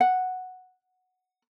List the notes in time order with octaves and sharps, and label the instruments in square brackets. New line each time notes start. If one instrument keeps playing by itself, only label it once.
[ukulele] F#5